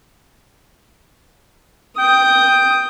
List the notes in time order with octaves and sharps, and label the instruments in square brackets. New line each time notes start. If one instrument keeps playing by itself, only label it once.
[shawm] G5 [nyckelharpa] D#6